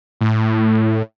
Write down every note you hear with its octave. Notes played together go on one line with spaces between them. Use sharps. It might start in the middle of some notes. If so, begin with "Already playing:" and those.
A2